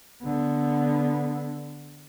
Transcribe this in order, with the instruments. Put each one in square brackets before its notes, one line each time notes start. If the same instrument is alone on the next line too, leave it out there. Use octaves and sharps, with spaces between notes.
[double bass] D3 B3